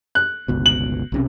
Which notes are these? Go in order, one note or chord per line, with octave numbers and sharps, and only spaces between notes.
F#6
G1 C#2 B2
F#7
B1 C3 C#4